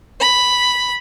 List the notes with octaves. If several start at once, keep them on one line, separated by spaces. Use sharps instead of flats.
B5